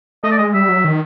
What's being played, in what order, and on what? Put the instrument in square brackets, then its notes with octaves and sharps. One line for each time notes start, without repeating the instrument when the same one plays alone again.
[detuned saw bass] A3 [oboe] D#5
[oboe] D5
[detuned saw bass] G#3 [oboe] D#5
[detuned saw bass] G3 [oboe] E5
[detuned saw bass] F#3
D#3